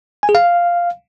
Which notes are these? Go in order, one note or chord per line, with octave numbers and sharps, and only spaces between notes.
G#5
G#4
F5